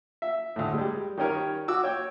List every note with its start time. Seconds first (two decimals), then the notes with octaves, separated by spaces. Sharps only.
0.22 E5
0.56 D2 A2
0.74 G3 G#3
1.17 D#3 G3 C#4 A#4 C#5
1.68 F#4 D6 E6
1.84 C#5 G5